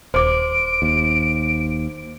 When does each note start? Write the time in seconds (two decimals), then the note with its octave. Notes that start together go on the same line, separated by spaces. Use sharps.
0.14 D#1 C5 D6 D7
0.82 D#2